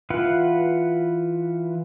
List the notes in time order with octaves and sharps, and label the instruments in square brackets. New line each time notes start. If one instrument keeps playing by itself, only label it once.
[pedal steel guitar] E3 F4 B4 F#5